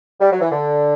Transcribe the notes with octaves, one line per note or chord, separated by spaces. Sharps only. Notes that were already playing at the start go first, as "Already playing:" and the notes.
G3
F#3
E3
D3